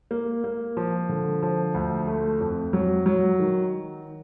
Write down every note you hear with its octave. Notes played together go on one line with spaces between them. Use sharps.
A#3
A#3
F3
D3
F3
D2
A3
F2
F#3
F#3
D#3